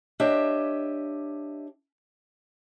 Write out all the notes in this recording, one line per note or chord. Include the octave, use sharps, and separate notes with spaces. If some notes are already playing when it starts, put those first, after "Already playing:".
D4 G4 C#5 D#5 E5